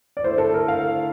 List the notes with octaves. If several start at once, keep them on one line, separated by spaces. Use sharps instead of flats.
D5
D3 A3 E4 C5
A4
A#4
F5